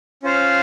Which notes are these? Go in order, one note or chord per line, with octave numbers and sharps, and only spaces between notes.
C#4 F4 C5 F5